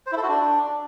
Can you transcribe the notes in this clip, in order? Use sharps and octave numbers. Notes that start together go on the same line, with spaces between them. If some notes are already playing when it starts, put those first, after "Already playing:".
C5
E4
A4
F#4
D4